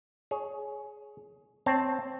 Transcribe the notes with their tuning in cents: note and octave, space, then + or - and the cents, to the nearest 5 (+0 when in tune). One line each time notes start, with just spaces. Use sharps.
G#4 +15 C#5 +0
C4 +0 C#5 -15 A5 +0